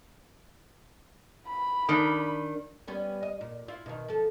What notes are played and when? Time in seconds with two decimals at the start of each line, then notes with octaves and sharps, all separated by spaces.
1.47 B5
1.89 D#3 D4 A#4
2.88 G3 B3 C#4
3.23 D#5
3.41 A#2
3.68 E4 F4
3.86 B2 D#3
4.08 F3 A4